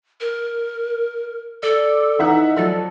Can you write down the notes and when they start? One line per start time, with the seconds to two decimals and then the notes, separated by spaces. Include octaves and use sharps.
0.21 A#4
1.63 A4 D5
2.19 E3 D#4 E5 F#5
2.57 F3 F#3 A4 D5